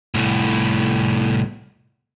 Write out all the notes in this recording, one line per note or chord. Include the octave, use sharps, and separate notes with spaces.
C2 A2